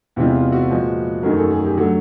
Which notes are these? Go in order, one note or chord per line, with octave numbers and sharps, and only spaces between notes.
E2 C3 E3 G#3 F4
F4
F#4
A#2 F3 G#3
F#2 D#3 F#3 A3 A#4
G#4
A4
G#4
G4
D3 F#3 A3 F#4